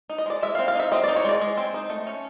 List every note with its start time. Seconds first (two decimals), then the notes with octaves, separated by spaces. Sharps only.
0.10 D#4
0.18 D#5
0.26 G#3 D5
0.43 G#3 E5
0.55 C4 F5
0.68 F5
0.75 D#4 E5
0.92 C4 D#5
1.04 D#4 D5
1.16 C#5
1.25 G#3 D5
1.41 G#3
1.57 C4
1.74 D#4
1.90 A3
2.07 C#4